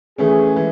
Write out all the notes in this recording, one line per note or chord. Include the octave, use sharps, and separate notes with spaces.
E3 A3 C#4 G#4
E3 G#3